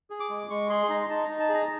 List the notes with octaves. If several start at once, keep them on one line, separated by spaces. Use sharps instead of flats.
G#4
D6
G#3
G#3 C#6
G#4 C6
D#4 A#5
D#4 A5
D#4 A#5
A5
G#4
A#5